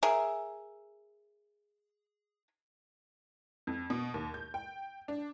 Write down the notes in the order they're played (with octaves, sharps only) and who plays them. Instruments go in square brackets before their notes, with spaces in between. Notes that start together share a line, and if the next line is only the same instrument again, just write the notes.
[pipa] G#4 A#4 E5
[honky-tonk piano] F2
B2
D#2
G6
G5
D4